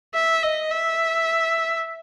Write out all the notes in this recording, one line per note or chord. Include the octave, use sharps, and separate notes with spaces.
E5
D#5
E5